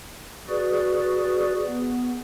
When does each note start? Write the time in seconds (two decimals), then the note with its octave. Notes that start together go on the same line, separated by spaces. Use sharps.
0.49 F#4 G#4 B4 D5
1.66 B3